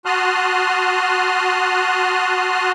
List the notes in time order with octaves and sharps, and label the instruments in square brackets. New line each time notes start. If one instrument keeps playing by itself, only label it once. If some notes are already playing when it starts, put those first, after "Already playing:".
[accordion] F#4 A5 C6 D#6 F6 F#6